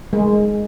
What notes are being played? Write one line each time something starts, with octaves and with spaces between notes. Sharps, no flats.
G#3